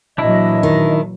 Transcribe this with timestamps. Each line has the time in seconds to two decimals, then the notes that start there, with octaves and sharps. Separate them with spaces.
0.18 A#2 E3 F#3 D4 E4 D#5
0.63 D#3